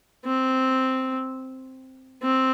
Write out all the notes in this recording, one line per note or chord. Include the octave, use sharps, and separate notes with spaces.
C4
C4